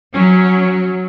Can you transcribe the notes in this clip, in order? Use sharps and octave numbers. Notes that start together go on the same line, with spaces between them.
F#3 C#4